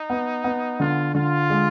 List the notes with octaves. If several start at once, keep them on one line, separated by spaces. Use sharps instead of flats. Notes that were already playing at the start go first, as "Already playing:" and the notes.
Already playing: D#4
B3
B3
D3 F4
D3 F4
G#3